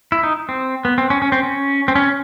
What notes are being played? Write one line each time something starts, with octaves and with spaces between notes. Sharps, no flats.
E4
D#4
C4
B3
C4
C#4
C#4
C4
C#4
C4
C#4